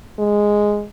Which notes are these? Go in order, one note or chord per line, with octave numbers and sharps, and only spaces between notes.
G#3